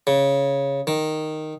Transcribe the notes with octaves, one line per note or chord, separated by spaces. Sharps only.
C#3
D#3